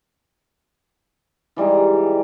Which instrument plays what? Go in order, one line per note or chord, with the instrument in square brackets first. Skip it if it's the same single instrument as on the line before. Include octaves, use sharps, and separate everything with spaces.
[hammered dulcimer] E3 G3 G#3 D#4